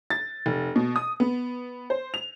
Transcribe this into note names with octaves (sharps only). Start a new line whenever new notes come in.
A6
F1
B2
D#6
B3
C5
F7